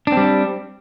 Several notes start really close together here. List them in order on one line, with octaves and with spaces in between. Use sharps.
D4 C4 G3